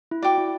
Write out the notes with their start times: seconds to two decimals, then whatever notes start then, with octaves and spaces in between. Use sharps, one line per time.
0.11 E4
0.22 F#4 D5 G5 D6
0.38 E4